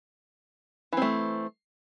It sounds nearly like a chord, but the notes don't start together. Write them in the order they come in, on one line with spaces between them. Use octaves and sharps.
E3 C4 A3